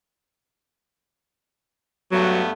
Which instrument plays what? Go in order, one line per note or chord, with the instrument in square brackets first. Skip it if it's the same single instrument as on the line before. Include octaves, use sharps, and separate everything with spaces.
[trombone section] G2 A3 B3 [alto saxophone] F#3